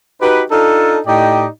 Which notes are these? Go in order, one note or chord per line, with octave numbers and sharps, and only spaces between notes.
D#4 F#4 G4 B4
D4 D#4 F4 A4
A2 D#4 G4 D5 D#5 G5